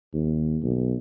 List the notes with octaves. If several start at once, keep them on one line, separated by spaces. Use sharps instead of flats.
D#2
B1